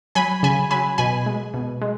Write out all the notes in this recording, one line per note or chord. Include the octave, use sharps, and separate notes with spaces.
F#3 G#5 B5
C#3 G#5 B5
F#3 G#5 B5
B2 G#5 B5
G#3
B2
G#3